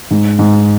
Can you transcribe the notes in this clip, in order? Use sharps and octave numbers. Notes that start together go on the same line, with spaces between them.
G#2
G#2